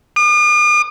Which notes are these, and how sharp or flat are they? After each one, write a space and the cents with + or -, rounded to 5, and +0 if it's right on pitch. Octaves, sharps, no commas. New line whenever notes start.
D#6 -45